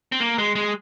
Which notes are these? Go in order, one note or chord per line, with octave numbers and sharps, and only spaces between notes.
C4
A#3
G#3
G#3